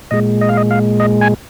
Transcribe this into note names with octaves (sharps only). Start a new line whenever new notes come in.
A#2 G#3 D#5
D#5
F5
D#5
F5
D#5
G#5